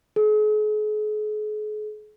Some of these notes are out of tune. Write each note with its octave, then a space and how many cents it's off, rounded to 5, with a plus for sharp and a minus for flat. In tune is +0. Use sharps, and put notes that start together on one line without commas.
G#4 +40